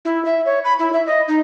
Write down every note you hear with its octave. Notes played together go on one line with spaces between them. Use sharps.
E4
E5
C#5
B5
E4
E5
D#5
D#4